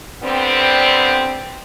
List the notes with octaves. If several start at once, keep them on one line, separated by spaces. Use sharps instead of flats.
D3 G3 B3 C4